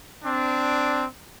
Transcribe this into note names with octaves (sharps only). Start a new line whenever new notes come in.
C4 D4